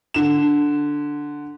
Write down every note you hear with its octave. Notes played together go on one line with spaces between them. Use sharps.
D3 E7